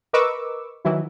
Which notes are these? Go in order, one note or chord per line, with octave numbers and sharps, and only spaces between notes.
A#4 B4 D#5 C#6 D6 E6
D#3 E3 F#3 E4